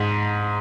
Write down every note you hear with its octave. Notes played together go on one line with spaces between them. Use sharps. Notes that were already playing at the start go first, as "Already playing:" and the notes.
Already playing: G#2